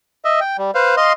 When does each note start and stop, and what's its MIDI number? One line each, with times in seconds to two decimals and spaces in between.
0.25 0.40 75
0.25 0.40 76
0.41 0.57 79
0.58 0.71 55
0.75 0.95 71
0.75 0.95 72
0.75 0.95 77
0.97 1.13 75
0.97 1.13 77
0.97 1.13 84